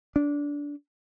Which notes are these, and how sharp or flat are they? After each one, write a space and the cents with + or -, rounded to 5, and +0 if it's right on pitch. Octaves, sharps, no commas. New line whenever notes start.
D4 -20